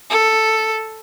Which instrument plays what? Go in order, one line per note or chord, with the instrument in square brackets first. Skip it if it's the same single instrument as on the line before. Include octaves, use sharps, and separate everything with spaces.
[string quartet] A4